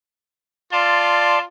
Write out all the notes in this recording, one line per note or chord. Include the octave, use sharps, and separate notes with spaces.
F4 D5 A5 C6